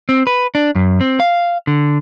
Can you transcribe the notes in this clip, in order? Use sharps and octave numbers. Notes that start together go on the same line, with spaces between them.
C4
B4
D4
F#2
C4
F5
D3